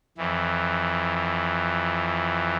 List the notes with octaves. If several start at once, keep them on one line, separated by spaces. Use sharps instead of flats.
F2 E3